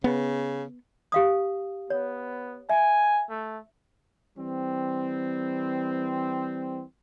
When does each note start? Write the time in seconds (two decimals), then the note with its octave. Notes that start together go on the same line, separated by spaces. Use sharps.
0.04 C#3 B3
1.12 G4 F5 D#6
1.90 B3 C#5
2.69 E5 G#5
3.30 A3
4.37 E3 G3 C4